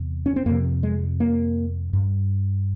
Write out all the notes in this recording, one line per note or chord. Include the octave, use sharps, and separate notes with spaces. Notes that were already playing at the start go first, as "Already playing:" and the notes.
Already playing: E2 C3
C#4
C4
F2 C3 A#3
G#3
A#3
G2